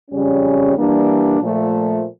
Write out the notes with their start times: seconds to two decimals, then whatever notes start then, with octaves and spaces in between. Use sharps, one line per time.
0.11 F2 C#3 G3 C#4
0.76 E3 G3 A#3 D4
1.41 A#2 F3 A3